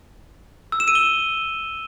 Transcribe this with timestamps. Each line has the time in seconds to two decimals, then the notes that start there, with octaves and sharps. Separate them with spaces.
0.72 E6
0.80 E7
0.88 D#7
0.95 G7